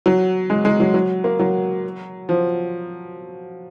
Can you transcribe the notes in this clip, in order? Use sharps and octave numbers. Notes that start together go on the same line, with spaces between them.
F#3
G#3
G#3
F#3
F#3
A#3
F#3
F3